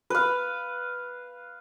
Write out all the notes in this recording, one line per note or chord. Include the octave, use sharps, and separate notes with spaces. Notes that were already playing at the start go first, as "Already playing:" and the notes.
B4 F5